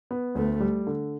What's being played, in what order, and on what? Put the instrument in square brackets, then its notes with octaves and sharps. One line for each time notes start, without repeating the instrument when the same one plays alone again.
[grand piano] B3
[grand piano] D2 [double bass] A3
[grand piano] G3
D3